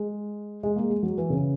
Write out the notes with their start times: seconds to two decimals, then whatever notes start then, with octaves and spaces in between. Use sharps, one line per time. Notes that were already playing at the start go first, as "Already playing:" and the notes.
Already playing: G#3
0.63 G#3
0.76 A#3
0.90 G#3
1.03 F#3
1.17 E3
1.30 C#3